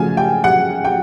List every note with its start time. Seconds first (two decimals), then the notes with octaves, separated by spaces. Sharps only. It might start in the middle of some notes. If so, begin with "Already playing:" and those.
Already playing: C#3 F3 A3 G#5
0.17 G5
0.44 F#5
0.84 G5